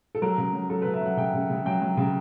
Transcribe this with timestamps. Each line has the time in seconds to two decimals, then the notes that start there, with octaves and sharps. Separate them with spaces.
0.15 A4
0.22 F#3 A#4
0.38 C#3
0.54 F#3
0.70 F#3 A4
0.82 B4
0.86 C#3
0.94 E5
1.02 F#3 F#5
1.17 C#3 G5
1.34 C#3
1.50 C#3
1.66 F#3 G5
1.82 F#3
1.97 C#3